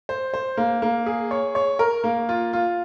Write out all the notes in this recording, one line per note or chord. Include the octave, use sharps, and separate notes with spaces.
C5
C5
A#3
A#3
G#4
C#5
C#5
A#4
A#3
F4
F4